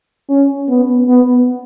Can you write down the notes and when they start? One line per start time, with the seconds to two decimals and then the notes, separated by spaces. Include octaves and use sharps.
0.29 C#4
0.69 B3
1.08 B3